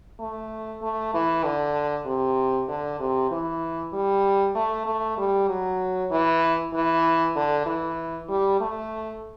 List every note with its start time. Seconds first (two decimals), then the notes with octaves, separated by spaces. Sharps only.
0.19 A3
0.81 A3
1.13 E3
1.44 D3
2.06 C3
2.68 D3
3.00 C3
3.31 E3
3.93 G3
4.55 A3
4.86 A3
5.17 G3
5.48 F#3
6.11 E3
6.73 E3
7.36 D3
7.66 E3
8.29 G3
8.60 A3